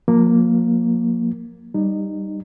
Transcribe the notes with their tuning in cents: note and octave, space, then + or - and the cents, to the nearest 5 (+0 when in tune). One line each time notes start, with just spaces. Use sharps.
F3 +40 A#3 +0
G3 +0 D#4 -15